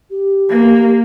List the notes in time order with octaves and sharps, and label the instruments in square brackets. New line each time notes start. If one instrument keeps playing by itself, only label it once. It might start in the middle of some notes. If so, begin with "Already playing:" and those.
[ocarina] G4
[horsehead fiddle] A#3